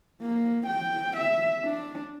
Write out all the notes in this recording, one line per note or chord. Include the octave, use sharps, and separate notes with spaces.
A#3
G5
E5
D4